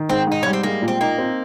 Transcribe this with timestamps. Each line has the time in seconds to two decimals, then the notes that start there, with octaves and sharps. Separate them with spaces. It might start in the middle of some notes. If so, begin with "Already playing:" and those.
Already playing: D#3
0.09 G#2 C4
0.27 G#2 D#4
0.43 G3 C#4
0.53 C4
0.63 G#3 A#3
0.82 A#2
0.88 C4
1.01 A#3 D#4
1.18 C4